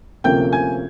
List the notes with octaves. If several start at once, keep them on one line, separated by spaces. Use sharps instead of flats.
D2 C3 F3 A#3 C#4 G5 G6
G#5 G#6